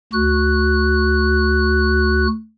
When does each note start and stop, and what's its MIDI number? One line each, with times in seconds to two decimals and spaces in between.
0.13 2.27 38
0.13 2.27 66
0.13 2.27 90